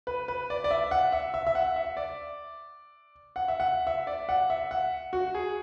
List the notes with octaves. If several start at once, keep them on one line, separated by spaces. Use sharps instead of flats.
B4
B4
D5
D5
E5
F#5
E5
E5
E5
F#5
E5
D5
F#5
E5
F#5
E5
D5
F#5
E5
F#5
F#4
G#4